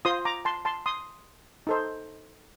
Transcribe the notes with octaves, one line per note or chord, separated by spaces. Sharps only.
F4 C5 C6 D#6
A#5 D6
A5 C6
A5 C6
C6 D#6
D#4 A4 C5